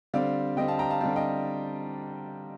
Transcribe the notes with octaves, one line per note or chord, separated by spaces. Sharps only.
D3 G3 C4 D5 F5
D3 G3 C4 D#5 G5
F5 A5
G5 A#5
F5 A5
D3 G3 C4 F5 A5
D#5 G5